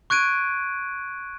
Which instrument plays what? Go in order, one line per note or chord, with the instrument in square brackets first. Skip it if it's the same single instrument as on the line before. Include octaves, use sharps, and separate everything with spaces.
[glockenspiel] C#6 F#6 G#6 D7 D#7